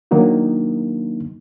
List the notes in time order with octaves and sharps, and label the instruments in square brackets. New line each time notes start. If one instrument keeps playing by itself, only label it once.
[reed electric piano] D#3 F#3 A#3 D4 D#4